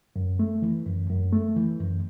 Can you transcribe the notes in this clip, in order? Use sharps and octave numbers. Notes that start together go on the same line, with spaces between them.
F#2
A3
E3
F#2
F#2
A3
E3
F#2